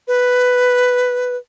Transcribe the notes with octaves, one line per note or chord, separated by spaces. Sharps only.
B4